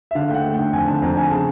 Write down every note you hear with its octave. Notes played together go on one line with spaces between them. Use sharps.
E5
D3 F5
A3 F#5 G5
A3
D3 G5
F2 G#5
D3 A5
F2 A#5
D3 G#5
C#3 A5